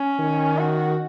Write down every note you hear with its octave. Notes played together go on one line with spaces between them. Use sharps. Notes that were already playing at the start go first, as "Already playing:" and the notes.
Already playing: C#4
D#3
F#4